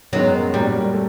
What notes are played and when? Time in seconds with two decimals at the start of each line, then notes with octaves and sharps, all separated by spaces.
0.13 F#2 D#3 F#3 G#3 B3
0.54 A#2 F#3 G3 A#3
0.94 A3